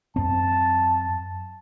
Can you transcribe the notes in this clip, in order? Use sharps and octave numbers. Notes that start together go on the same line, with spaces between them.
F#2 C4 A5